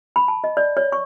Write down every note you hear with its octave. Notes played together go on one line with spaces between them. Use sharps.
B5
A5
D#5
D5
C#5
C#6